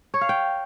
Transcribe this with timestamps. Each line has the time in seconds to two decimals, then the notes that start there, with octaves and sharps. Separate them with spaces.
0.14 C#5
0.21 F5
0.29 G5